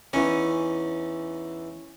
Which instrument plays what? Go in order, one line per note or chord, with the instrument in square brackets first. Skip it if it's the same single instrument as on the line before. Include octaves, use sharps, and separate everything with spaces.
[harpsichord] E2 E3 D#4 [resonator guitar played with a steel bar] C#4